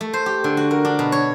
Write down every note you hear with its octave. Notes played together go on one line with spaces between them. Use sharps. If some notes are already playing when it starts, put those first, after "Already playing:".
A3
C5
G4
D3
F#4
A#4
D4
B2
C#5